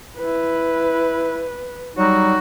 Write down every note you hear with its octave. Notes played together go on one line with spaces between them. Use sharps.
E4 B4
F#3 G3 D#4 F#4